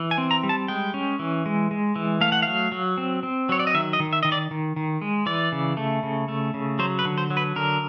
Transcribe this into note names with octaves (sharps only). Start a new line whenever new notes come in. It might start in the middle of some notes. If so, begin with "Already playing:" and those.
Already playing: E3
G#5
C4
A#5
G3
A5
G#3 G5
C#4
E3
G#3
G#3
E3
A3 F5
F#5
F#3 F5
F#3
C4
C4
F#3 C#5
D5
D#5
D#3 E5
D#5
D#3
E5
D#3 D#5
D5
D#3
D#3
G#3
E3 D5
C#3
A3
C#3
A3
C#3
F#3 C5
B4
D3
C5
F#3
B4
D3 A#4